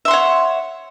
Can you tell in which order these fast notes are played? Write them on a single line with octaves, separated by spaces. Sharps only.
E5 C6 F#5 C#5